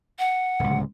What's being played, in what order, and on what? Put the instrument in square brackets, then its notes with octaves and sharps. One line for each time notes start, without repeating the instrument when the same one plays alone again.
[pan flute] F#5
[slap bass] D1 C#2